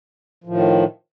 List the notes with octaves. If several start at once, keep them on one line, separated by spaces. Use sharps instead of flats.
A2 D#3 F3